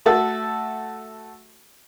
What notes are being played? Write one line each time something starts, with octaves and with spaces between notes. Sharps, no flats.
A3 F#4 A4 E5